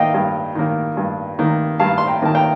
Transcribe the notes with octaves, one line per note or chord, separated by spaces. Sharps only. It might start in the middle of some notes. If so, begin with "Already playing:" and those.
Already playing: D#3 A#3 D#5 F5 G5
G2
D#3 A#3
G2
D#3 A#3
G2 F5 A5
C6
G5 A#5
D#3 A#3 A5
G5 A#5